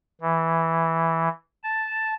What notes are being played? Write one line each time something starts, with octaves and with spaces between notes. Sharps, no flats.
E3
A5